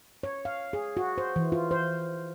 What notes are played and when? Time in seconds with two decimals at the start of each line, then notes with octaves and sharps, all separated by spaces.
0.23 C#5
0.45 F5
0.73 G#4
0.97 F#4
1.18 C5
1.36 E3
1.52 F4
1.71 C5